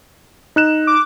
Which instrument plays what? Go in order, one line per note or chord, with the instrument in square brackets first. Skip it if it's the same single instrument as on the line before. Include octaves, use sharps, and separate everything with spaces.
[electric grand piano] D#4 F#6 E7
[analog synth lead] D6